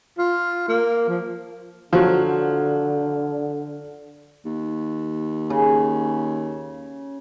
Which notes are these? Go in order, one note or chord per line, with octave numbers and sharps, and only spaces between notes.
F4
A#3
F3
D3 F3 F#3
D#2
C#3